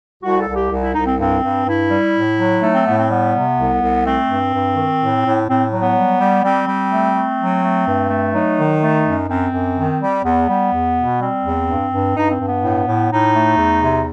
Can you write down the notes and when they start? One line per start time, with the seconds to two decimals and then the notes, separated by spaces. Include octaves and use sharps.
0.23 C2 F#4
0.39 A4
0.48 C2
0.55 G4
0.71 C2
0.82 E4
0.94 C2 D#4
1.06 C4
1.18 G2 C4
1.43 G2
1.66 G2 E4
1.90 G3
2.14 A2
2.38 F#3
2.62 A3 D#4
2.73 C4
2.86 A2 B3
2.97 C4
3.09 G3 B3
3.34 C3
3.57 C2
3.81 C2
4.05 A3 C4
4.29 G2
4.53 G2
4.76 D#3
5.00 A2
5.25 A2
5.48 A2 C4
5.71 F#3
5.80 B3
5.95 G3
6.20 G3
6.44 G3 C4
6.67 G3
6.91 A3
7.15 A3
7.39 F#3
7.63 A3
7.87 G2
8.10 A3
8.34 F#3 D#4
8.58 D#3
8.81 A3
9.05 F#2
9.29 F#2 C4
9.53 F#2
9.76 D#3
10.01 G3
10.24 E2 B3
10.49 G3
10.72 E2
10.96 B2
11.20 G3 C4
11.43 E2
11.67 G2
11.91 G2
12.16 G2 D#4
12.31 C4
12.39 G2
12.47 B3
12.63 A2
12.87 A2
13.11 A2 D#4
13.35 A3
13.58 E2
13.83 C3